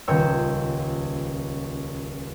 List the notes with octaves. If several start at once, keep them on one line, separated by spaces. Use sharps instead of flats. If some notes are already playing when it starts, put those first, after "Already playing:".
D#1 C#2 C#5 G5 E6